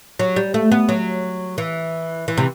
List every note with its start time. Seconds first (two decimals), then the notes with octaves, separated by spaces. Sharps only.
0.19 F#3
0.36 G3
0.54 A3
0.72 B3
0.89 F#3
1.58 E3
2.28 E3
2.37 C3